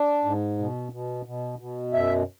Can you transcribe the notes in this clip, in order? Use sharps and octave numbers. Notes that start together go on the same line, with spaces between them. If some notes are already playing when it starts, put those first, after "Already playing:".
Already playing: D4
G#2
B2
B2
B2
B2
F#2 E5